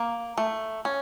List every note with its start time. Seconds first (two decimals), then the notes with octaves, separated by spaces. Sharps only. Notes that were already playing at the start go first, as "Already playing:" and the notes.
Already playing: A#3
0.38 A3
0.85 C#4